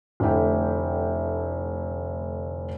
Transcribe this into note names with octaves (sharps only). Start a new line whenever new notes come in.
F1 D3 A3 E4 G5